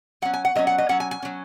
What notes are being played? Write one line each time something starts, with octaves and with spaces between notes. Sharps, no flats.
F#3 C#4 F#5
G#5
F#5
F#3 C#4 D#5
F#5
D#5
F#3 C#4 F#5
G#5
G#5
F#3 C#4